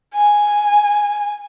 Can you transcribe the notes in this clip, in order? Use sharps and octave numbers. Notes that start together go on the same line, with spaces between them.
G#5